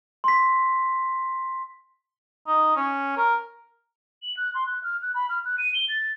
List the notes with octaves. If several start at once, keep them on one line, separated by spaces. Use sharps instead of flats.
C6 B6
D#4
C#4
A#4
F#7
F#6
C6
F#6
F6
F#6
B5
F6
F#6
D#7
G7
A6